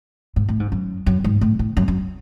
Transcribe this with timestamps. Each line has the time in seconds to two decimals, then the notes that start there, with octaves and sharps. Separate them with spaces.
0.36 G#2
0.49 A2
0.60 G#2
0.72 F#2
1.06 F#2
1.24 G#2
1.41 A2
1.59 A2
1.77 F#2
1.88 F#2